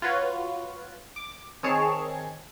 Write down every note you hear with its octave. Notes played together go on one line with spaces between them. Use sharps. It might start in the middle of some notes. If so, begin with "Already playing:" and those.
F4 F#4 B4 C#5
D6
D#3 C4 G#4 C#5 A5